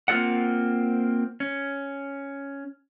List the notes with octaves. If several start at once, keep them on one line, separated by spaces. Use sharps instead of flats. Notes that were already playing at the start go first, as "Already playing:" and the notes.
A#3 C4 F4 A4 D5 F#5
C#4